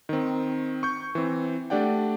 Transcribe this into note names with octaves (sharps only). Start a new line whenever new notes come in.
D#3 C4
C#6 G6
E3 C4
A3 D4 G4 D5 F#5 G5